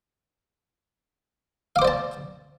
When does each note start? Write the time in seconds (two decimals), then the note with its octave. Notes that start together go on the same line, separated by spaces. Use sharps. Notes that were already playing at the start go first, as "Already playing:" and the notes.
1.76 F5
1.79 D6
1.82 C5
1.85 D5
1.88 A5